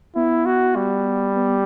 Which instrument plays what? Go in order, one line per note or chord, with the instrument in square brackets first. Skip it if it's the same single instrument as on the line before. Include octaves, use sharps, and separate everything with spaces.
[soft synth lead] B3 [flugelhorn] E4
[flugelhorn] F#4
G3
[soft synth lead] B3